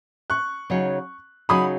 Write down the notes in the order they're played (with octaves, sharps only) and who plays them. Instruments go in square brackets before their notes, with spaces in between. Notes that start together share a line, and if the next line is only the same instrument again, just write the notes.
[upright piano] C#6 F#6
[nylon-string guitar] C#3 F#3 D#4 G#4 C#5
[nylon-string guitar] C#3 F#3 D#4 G#4 C#5 [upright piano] B5 D#6